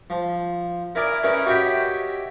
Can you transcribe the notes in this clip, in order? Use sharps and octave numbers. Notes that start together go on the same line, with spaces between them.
F3
E4 A#4 D5 D#5 G#5
C#4 D#4 E4 A#4 B4
F#4 G4 C#5 D#5 E5 G5